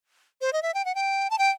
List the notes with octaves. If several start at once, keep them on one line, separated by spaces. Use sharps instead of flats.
C5
D#5
E5
G5
F#5
G5
A5
G5